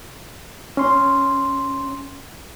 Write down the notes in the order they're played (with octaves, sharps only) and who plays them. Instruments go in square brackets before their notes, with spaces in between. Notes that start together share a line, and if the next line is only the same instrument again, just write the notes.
[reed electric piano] C#4 C6